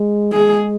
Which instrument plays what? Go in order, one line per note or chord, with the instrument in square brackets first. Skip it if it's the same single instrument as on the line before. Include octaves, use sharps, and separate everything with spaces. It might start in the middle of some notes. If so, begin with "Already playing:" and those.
Already playing: [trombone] G#3
[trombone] G#3 [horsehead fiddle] G#4